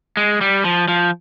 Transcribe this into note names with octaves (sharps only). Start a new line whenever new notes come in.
G#3
G3
F3
F3